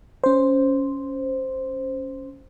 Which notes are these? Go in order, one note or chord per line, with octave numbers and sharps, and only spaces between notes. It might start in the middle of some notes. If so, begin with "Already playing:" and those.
C#4 C5